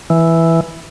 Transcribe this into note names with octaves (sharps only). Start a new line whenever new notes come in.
E3